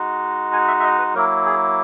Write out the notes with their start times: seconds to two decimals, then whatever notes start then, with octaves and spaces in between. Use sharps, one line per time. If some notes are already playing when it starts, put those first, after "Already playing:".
Already playing: G#3 D#4 F#4
0.53 G#5
0.68 E5
0.80 E5
0.84 D#5
0.99 B4
1.15 F#3 A#3 E4 A#4
1.46 G#4